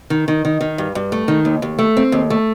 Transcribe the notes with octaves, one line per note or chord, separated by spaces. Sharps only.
D#3
D#3
D#3
D#3
G2
G2
A3
D#3
D#2
D#2
A3
C4
D#2
A3